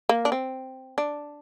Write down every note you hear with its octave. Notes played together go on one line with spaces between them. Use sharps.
A#3
D4
C4
D4